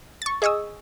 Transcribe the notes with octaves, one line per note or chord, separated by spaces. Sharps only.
C#6 A6
G#4 D#5 C#6 D#6 E6